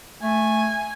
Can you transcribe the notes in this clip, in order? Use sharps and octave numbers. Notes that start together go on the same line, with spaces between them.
A3 G#5